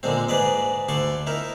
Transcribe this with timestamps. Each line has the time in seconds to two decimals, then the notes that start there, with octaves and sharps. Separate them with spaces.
0.03 A#2 D3 G#3 C4
0.28 G#2 G#4 B4 D5 D#5
0.88 D2 D3 D5 C6 C#6
1.27 D#4 E4 A#4